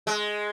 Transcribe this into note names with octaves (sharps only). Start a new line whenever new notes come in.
G#3